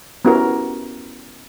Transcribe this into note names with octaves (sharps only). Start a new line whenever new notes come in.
B3 C#4 E4 F#4 G4 A#4